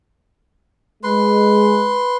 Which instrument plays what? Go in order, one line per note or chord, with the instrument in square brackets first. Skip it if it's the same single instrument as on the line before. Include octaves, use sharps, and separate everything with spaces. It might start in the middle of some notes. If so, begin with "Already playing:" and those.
[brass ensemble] G#3 [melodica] B4 C6